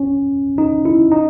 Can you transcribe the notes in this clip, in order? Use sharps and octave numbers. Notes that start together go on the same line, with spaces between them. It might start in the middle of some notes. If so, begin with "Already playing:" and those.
Already playing: C#4
D#4
E4
D#4